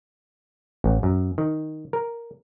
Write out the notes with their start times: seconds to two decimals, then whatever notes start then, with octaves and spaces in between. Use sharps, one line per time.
0.84 A1
1.03 F#2
1.38 D#3
1.93 A#4